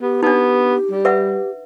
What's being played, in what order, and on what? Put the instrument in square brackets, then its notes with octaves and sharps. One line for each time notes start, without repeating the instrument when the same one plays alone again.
[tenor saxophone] B3 [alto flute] G4
[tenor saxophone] B3 [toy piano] D4 D#4
[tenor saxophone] G3
[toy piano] B4 E5 F#5